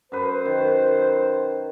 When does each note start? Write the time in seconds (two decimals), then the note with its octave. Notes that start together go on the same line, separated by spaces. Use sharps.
0.12 F#2 B4 C5
0.45 D#3